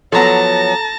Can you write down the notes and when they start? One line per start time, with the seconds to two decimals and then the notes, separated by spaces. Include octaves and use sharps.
0.12 F3 F#3 B3 A4 C#5 A5 A#5 A#6